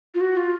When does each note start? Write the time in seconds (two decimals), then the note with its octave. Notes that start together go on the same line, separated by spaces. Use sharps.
0.14 F4
0.21 F#4
0.37 F4